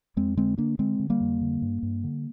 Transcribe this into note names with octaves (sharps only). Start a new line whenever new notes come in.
F2 G#3 C4
D3 G#3 C4
D3 A#3 D4
D3 G#3 C4
D3
G3 A#3
F2
D3
G2
G2
D3